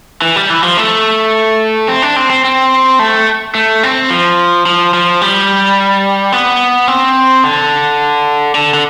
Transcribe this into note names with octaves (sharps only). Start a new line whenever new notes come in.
E3
G3
E3
F3
A3
C4
D4
C4
C4
C4
A3
A3
C4
F3
F3
F3
G3
B3
C4
D3
D3
D3